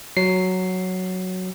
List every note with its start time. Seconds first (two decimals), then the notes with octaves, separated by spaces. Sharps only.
0.17 F#3 C7